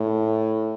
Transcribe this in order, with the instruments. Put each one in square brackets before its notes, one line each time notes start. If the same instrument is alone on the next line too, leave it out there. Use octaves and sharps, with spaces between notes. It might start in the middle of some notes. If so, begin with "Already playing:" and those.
Already playing: [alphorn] A2